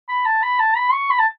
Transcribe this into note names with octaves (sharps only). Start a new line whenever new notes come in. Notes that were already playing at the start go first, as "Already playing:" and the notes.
B5
A5
B5
A5
B5
C#6
B5
A5